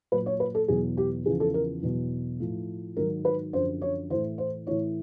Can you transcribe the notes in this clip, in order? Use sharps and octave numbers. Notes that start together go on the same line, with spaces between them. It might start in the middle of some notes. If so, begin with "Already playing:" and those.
A#2 F#3 B4
C#5
B4
A4
E2 B2 F#3 G#4
G4
E2 C#3 F3 G#4
A4
A#4
E2 B2 F#3
A2 F3
G#2 D#3 F#3 A#4
B4
F#2 D3 F3 C5
C#5
A2 E3 C5
C5
A2 E3 C#5